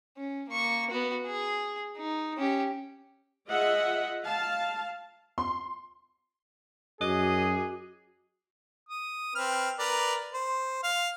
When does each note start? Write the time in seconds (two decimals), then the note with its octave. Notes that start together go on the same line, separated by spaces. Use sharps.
0.17 C#4
0.49 A#3 C#6
0.90 B3 F#4
1.27 G#4
1.97 D#4
2.38 C#4 G4
3.48 F4 G#4 D#5 E5 F#5
4.24 F5 A5
5.38 C6
7.01 F#2 F#4 G#4 D#5 D6
8.89 D#6
9.35 C4 B4 F6
9.79 A#4 B4 D5
10.34 C5
10.83 F5